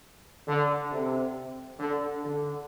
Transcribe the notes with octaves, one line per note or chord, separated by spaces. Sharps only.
D3
C3
D3
D3